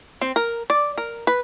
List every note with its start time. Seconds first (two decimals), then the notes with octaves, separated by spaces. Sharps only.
0.21 C4
0.36 A#4
0.70 D5
0.98 A#4
1.27 B4